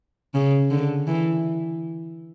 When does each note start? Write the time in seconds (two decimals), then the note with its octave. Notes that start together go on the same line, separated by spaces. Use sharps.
0.34 C#3
0.71 D3
1.07 E3